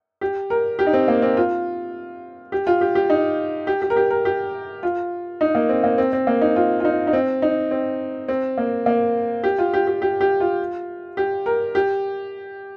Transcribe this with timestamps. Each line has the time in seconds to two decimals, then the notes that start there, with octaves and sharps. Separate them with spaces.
0.21 G4
0.50 A#4
0.79 G4
0.87 D#4
0.93 C4
1.08 A#3
1.22 C4
1.37 F4
2.52 G4
2.67 F4
2.81 G4
2.95 G4
3.10 D#4
3.67 G4
3.82 G4
3.90 A#4
3.96 G4
4.11 A#4
4.25 G4
4.83 F4
5.41 D#4
5.55 A#3
5.69 C4
5.84 A#3
5.98 C4
6.13 C4
6.27 A#3
6.41 D#4
6.56 F4
6.80 F4
6.85 D#4
7.07 D#4
7.13 C4
7.42 D#4
7.71 C4
8.28 C4
8.58 A#3
8.86 A#3
9.44 G4
9.58 F4
9.74 G4
9.87 G4
10.02 G4
10.21 G4
10.40 F4
11.17 G4
11.46 A#4
11.75 G4